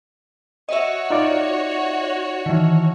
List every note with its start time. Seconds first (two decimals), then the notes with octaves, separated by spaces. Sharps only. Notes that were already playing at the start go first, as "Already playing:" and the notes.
0.69 F#4 C#5 D#5 E5
1.10 D#4 F4 D5
2.46 D#3 E3